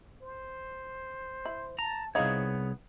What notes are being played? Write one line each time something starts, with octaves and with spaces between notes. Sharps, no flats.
C5
E4
A5 A#5
C2 B3 D#4 E4 G#4 C#5 F5